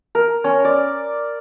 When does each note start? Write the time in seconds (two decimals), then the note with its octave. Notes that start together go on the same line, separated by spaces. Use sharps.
0.15 A#4
0.44 C#4
0.65 D5